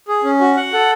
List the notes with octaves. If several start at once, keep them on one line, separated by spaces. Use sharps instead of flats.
G#4
C#4
F#4
F#5
A4